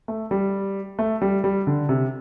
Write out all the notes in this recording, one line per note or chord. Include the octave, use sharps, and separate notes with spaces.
A3
G3
A3
G3
G3
D3
C3